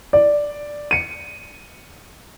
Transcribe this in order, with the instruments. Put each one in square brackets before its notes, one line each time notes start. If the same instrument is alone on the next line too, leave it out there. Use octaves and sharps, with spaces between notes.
[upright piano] D5
C#7 D#7